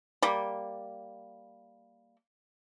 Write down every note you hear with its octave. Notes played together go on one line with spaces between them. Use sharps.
G3 A#3